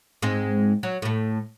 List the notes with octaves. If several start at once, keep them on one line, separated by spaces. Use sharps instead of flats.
G#2 G#3 C4
F#3
A2 A3